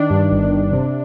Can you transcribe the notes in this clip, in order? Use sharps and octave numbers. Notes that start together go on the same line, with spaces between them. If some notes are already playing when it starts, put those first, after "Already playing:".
Already playing: D#3 D4
G2
G1
G1
C3